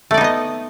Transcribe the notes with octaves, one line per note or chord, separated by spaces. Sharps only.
A3 B3 D#4 D5 D#5